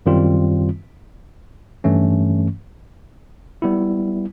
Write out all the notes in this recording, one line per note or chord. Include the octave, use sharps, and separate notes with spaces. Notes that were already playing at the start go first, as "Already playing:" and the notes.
F#2 D#3 G3 C4 F4
G2 E3 A3 C#4
G3 B3 E4